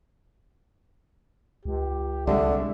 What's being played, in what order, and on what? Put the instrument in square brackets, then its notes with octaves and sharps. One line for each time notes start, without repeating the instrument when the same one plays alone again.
[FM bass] C#2 [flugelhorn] G4
[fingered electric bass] C2 G3 G#3 [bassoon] D3 [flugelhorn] E5